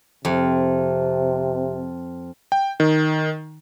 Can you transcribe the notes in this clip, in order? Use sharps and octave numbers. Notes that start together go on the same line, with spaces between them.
F2 C3
G5
D#3